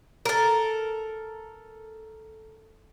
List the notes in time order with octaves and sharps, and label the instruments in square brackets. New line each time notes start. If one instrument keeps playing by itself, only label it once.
[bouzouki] A4 A#4